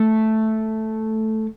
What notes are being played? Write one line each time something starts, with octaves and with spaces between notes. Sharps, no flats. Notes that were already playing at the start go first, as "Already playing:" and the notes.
Already playing: A3